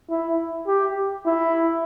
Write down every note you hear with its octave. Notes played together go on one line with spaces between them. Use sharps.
E4
G4
E4